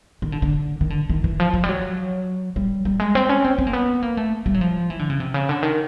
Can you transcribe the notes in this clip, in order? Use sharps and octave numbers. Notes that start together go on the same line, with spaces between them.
D#3
D3
D3
D#3
D3
D#3
E3
F3
F3
G3
F#3
G3
G3
G#3
C4
C#4
C4
C4
A#3
B3
A#3
A3
G3
F#3
F3
E3
D3
C#3
C3
C#3
D3
D#3